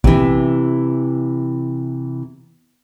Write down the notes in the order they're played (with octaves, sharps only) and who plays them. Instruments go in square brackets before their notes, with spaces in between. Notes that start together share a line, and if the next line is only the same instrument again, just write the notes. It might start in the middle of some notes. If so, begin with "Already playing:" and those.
[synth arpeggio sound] A#1 [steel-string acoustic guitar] C3 E3